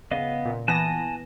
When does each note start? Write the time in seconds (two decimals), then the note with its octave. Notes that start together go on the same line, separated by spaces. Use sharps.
0.11 C#3 B3 D#5 F5
0.45 A#2
0.68 E3 B3 G#5 A5 F#6 A#6